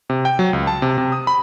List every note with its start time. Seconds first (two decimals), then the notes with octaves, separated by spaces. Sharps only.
0.10 C3
0.25 G5
0.39 F#3
0.53 C#2
0.67 A5
0.82 C3
0.98 C3
1.12 D#6
1.27 B5